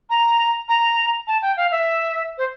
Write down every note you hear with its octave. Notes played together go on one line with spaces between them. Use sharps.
A#5
A#5
A5
G5
F5
E5
C5